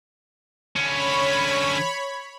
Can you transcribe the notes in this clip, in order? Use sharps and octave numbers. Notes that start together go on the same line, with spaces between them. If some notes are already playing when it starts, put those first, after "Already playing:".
D3 C#4 C#5 B5